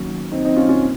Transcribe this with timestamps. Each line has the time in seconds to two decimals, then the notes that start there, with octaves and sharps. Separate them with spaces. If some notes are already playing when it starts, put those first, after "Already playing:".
Already playing: D#3 F#3 A#3 C#4
0.32 C4 D#4
0.45 C4 D#4
0.57 C#4 F4
0.69 C#4 F4
0.82 A#3